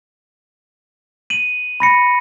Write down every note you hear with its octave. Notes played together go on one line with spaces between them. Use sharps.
D#7 F#7
B5 A#6 C#7